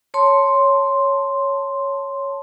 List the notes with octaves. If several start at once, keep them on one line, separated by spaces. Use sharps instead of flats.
C#5 A5 C6